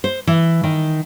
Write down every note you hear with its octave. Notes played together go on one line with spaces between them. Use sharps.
C5
E3
D#3